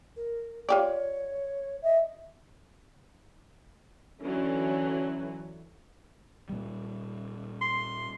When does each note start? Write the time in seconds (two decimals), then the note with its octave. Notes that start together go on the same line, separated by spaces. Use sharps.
0.16 A#4
0.69 F4 G4 C#5 D5
1.84 D#5 E5
4.22 D3 E3 F#3 C#4
6.49 A#2 G3
7.61 C6